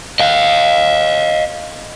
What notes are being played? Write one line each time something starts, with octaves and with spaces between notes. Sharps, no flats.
D#5 F5